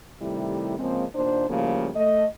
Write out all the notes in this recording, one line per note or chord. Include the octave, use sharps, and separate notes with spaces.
C3 D#3 G3 A3 E4
C#3 F3 G#3 A#3 C4
D#2 A#2 D4 C5
A2 C#3 F3 G3 A#3
A3 D#5